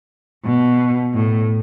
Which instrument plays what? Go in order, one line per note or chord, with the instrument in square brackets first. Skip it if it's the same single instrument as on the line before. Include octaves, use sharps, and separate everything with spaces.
[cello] B2
A2